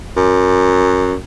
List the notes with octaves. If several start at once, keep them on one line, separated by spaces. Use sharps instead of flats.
F#2